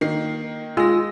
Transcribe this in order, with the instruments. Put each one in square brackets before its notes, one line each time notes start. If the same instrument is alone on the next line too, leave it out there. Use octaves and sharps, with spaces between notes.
[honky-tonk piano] D#3 A#3 C7
[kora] G#3 [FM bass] F4 [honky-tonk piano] E6 A#6